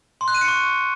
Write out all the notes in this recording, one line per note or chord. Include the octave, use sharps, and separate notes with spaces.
C6
F#6
D#7
C#7
C#6